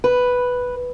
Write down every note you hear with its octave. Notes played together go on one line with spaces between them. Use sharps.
B4